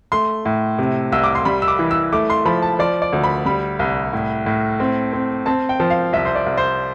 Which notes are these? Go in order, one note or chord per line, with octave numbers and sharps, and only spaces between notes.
A3 C6
A2
C3
C2 E6
D6
C6
G3 B5
E6
D6
E3
E6
A3 D6
C6
F3 B5
A5
F3 D5
D5
D2
B5
G3 B5
C2
A2
A2
C4
C4
C4 A5
G5
F3
F5
C2 E5
C5
D5
C2
C5